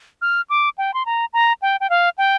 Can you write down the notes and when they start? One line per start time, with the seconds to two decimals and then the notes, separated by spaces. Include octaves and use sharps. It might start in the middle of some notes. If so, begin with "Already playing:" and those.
0.22 F6
0.50 D6
0.78 G5
0.94 C6
1.06 A#5
1.33 A#5
1.62 G5
1.81 G5
1.90 F5
2.18 G5